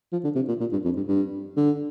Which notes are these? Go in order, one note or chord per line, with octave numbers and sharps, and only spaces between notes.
F3
D3
C3
A#2
A#2
G2
F2
G2
G2
D3